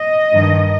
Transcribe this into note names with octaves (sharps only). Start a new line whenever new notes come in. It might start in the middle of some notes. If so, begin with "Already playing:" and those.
Already playing: D#5
G2 D#3